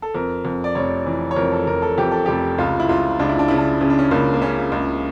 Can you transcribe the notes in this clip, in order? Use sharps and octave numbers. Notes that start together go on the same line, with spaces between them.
A4
F2 A#4
F2
D5
F1 C#5
E3
C#5
F2 A#4
A4
F2 A#4
A4
F2 G4
A4
F1 G4
C#2 F4
E4
C#2 F4
C#2 D4
E4
D4
C#3 E4
D4
C#3 C#4
D4
C#4
C#2 A#3
A#3
C#3 C#4
C#2